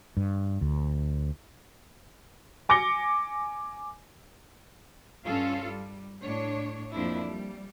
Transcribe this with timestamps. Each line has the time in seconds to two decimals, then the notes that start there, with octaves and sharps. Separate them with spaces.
0.17 G2
0.61 D2
2.69 G#5 D6 A#6 C#7 G7
5.25 G2 C#4 F4 A4 F5
5.65 G3
6.22 A2 D4 C#5
6.92 F2 F3 A#3 D4 E4
7.27 G3